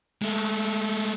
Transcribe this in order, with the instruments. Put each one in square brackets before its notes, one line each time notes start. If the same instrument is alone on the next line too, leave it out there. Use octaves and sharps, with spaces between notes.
[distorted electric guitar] G#3 A3